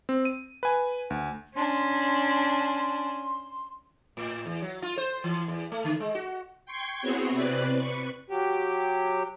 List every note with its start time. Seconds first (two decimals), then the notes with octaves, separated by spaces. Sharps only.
0.09 C4
0.25 D#7
0.63 B4 G#5
1.10 D2
1.56 C#4 D4 C6
4.17 A2
4.46 E2
4.62 F#3
4.82 F4
4.98 C5
5.24 E3
5.48 E2
5.72 A3
5.84 D3
6.00 G#3
6.15 F#4
6.66 G5 C6 C#6 G#6
7.01 B3 C4 E4 F#4 G#4 C#5
7.31 C3 C4 B4 D5 F#6
7.77 B4 C#6
8.30 F#3 G4